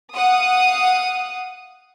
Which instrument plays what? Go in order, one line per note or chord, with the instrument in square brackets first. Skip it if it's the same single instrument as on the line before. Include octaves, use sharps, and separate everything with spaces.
[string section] F5 F#5 D#6